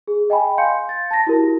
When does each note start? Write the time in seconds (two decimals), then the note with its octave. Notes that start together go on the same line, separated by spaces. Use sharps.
0.08 G#4
0.30 D#5 G5 G#5 B5
0.58 F5 C6 G6 C#7
0.89 A6
1.11 A5 A#6
1.27 E4 F#4 G4 A#4